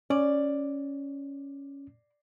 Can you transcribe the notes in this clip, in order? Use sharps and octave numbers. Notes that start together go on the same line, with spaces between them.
C#4 D5